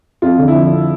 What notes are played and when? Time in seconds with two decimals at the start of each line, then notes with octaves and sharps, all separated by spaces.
0.22 F2 F4
0.39 D3
0.48 E4
0.56 F3